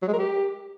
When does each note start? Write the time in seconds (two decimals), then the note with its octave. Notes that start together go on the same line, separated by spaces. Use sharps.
0.02 F#3
0.08 G#3
0.13 A#4
0.19 G4